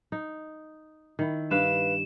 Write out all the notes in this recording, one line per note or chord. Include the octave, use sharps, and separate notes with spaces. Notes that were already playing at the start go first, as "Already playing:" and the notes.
D#4
D#3 E4
G2 B4 F5 E7